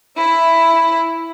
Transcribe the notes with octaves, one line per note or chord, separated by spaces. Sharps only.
E4 E5